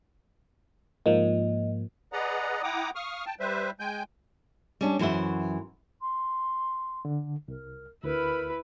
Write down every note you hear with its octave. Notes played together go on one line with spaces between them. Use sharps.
G#2 F3 A#3 D#5
G#4 B4 D5 D#5 F#5 A#5
E4 F#5 G5 A#5 D6 D#6
F5 C#6 D#6 F6
G5 A5
G3 B4 C5 E5
G#3 G5 G#5 G6
G3 C#4 D4
F#2 E3 F#4 C5 E5
C6
D3
C2 A#4
D2 E4 A#4 B4